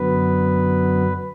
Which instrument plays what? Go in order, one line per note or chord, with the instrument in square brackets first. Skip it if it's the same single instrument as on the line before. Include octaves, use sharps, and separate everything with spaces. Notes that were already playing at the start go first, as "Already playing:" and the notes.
Already playing: [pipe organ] F#2 D3 F#3 B3 B4